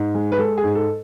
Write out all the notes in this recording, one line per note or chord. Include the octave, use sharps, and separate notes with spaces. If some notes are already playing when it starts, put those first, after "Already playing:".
Already playing: G#2
G#3
B4
G#3 A4
G#4
G#2
A4